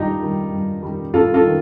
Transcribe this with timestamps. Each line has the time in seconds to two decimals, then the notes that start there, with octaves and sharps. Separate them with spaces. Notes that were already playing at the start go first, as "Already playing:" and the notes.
Already playing: G2 D#3 G3 D#4 F4 G4
0.21 D#3 G3
0.52 G2
0.83 D#3 G3
1.14 G2 F4 A4
1.34 F4 A4
1.44 D#3